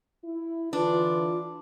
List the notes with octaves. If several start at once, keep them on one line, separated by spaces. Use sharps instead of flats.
E4
D3 E3 D4 F4 B4